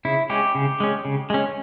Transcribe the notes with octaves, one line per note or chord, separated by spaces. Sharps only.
C#3 E4
G#3 C#4 G4
C#3
G#3 C#4
C#3
G#3 C#4